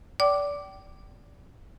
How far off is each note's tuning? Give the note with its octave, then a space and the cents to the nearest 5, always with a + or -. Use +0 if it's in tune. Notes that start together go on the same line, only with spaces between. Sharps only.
D5 -25 G5 -30 D6 +0